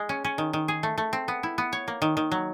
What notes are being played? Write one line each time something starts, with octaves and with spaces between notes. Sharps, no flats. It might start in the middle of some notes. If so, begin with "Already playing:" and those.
Already playing: G#3
C#4
C#4
D#3
D#3
G#4
A3
A3
C4
B3
E4
B3
C#5
A#3
D#3
D#3
F#3